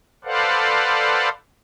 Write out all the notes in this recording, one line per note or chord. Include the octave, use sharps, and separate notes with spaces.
A4 B4 C5 D5 F5 F#5